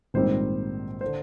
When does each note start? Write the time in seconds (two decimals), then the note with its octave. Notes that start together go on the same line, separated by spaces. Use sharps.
0.14 A#1 G#2 D#3 G3 C4 C5
1.01 D3 C5